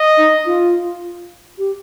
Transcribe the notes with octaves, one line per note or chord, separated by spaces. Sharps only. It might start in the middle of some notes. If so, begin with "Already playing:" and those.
Already playing: D#5
D#4
F4
G4